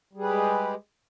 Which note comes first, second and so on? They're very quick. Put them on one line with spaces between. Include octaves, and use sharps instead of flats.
G3 G#4 B4 G4 G#3